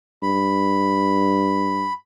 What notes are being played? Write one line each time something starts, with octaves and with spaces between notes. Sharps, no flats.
G2 B5